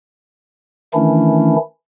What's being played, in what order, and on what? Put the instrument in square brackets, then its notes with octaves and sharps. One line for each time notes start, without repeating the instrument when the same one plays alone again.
[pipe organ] D#3 E3 A3 C#4 D4 E4